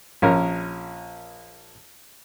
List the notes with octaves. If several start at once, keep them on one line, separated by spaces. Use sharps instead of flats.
A#1 C#4 A#4